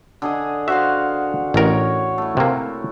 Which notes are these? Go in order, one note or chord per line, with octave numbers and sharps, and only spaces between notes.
D3 G#4 D#5
F#4 C5 E5 F5
A1 A#4 C#5
A3 E4
C3 A#3